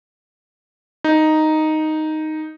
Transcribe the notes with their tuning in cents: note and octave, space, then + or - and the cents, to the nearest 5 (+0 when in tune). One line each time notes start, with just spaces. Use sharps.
D#4 +0